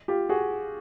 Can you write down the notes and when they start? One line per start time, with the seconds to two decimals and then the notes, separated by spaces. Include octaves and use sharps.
0.08 F4 G4
0.29 F#4 G#4